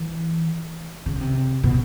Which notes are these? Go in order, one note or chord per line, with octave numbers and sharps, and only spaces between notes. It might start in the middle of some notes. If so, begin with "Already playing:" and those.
Already playing: E3
C#3
C3
B2